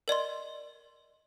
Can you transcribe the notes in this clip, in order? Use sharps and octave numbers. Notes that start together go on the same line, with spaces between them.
A#4 D5 D#5 C6